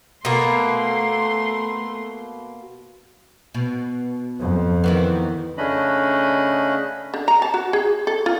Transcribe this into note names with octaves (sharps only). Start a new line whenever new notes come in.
B2 A3 A#3 C6
B2
F2
D#3 E3 B3
C#3 A3 C#4 D4 D#5 B5
D3
A#5
A5
F#4
G#4
A4
F4